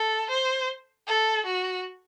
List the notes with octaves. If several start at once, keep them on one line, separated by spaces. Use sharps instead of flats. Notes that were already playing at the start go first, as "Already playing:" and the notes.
Already playing: A4
C5
A4
F#4